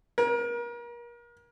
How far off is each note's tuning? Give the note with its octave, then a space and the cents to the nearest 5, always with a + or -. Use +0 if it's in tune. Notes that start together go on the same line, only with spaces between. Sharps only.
A#4 +35